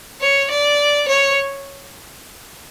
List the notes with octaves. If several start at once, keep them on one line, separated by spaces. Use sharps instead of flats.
C#5
D5
C#5